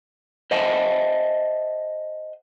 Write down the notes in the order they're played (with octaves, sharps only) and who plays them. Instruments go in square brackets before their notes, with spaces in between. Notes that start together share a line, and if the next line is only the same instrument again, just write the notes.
[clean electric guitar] C5 D#5 E5 F#5 G#5 A5